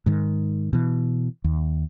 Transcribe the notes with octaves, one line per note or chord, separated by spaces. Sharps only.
G#2 D#3
B2 E3
D#2